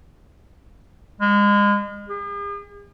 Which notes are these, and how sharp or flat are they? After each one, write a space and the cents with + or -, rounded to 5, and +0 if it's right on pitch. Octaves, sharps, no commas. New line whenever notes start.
G#3 -30
G#4 -45